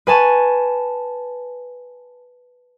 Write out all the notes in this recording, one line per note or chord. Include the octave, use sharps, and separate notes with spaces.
B4 G#5 A5 C#6